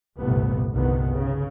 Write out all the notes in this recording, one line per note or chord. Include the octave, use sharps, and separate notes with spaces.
G1 C2 A#2 A3 B3
G1 C2 D3 D#3 B3
C#3